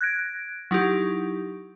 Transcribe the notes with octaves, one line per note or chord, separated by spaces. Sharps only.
F#6 G#6 A#6 D7
F#3 D#4 E4 G4